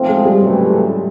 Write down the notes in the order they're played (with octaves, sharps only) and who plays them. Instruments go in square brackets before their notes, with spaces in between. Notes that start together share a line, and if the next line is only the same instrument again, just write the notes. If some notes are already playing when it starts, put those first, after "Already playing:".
Already playing: [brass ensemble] B1 A2 F3 A3 C4
[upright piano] G#3
G3
[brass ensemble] C#2 C3 E3 A3 [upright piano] F#3